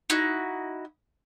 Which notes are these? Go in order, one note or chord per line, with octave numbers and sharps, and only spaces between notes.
D#4 E4 F#4